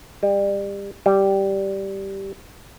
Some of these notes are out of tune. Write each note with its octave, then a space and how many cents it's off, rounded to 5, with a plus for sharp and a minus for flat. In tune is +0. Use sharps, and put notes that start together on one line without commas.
G3 +30
G3 -5